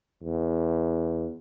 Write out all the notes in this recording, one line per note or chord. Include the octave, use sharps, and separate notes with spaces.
E2